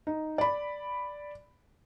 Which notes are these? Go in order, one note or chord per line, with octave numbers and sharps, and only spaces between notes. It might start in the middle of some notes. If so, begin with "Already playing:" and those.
D#4
D5 B5